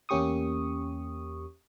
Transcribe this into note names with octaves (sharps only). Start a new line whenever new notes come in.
E2 A#3 C#4 G4 C#6 D#6